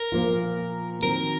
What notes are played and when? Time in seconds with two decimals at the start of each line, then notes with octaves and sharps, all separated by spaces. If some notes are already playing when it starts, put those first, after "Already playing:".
Already playing: A#4
0.12 A#2 F3 A#3 F4
1.02 D#3 F#3 C4 A#4